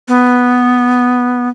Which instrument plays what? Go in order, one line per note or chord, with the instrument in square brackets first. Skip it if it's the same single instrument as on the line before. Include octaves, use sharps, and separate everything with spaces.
[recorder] B3